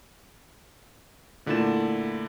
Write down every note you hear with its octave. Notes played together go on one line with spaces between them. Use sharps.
A#2 D3 A3 E4 A6 E7